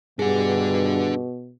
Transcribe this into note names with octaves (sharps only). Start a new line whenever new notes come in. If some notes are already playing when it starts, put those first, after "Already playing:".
G2 B2 D4 G#4 F#5